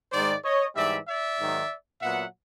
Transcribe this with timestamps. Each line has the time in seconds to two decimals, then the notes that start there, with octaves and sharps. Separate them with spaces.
0.12 G#2 D#3 G#3 C5 D5
0.43 C#5 D#5
0.75 G#2 E3 G3 D5 E5
1.07 D5 E5
1.39 G#2 D#3 F#3
2.02 A#2 F#3 B3 E5 F#5